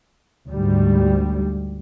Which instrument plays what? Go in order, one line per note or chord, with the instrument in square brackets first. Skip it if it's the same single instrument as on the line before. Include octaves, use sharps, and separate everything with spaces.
[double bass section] D2 G#2 G3